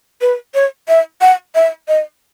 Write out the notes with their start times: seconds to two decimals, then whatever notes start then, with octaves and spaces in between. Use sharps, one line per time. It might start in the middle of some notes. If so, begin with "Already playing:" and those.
0.21 B4
0.54 C#5
0.88 E5
1.21 F#5
1.55 E5
1.88 D#5